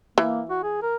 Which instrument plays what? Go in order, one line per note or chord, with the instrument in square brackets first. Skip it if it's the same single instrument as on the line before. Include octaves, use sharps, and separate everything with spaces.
[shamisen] E3 [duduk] A#3
[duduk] F#4
G#4
A#4